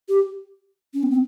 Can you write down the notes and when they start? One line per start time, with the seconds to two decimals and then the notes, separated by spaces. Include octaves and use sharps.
0.09 G4
0.94 C#4
1.03 B3
1.11 C4